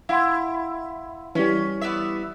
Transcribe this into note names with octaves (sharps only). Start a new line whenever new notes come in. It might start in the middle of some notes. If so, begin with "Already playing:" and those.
E4 F5 F#5 C6
E3 G3 C#4
B3 D5 E5